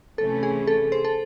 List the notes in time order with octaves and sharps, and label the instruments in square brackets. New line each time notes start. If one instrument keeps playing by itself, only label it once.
[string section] C3 E3 A3 C#4 [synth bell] A4
[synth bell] G#4
A4
C5
A4